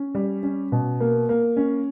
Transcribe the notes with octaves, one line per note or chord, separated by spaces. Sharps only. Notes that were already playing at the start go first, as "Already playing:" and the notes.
Already playing: C#4
G3
C#4
B2
A#3
A#3
C#4